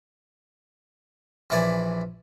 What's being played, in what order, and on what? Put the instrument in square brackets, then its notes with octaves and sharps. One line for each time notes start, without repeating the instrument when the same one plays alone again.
[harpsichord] A#1 E3 E4 D5 G#5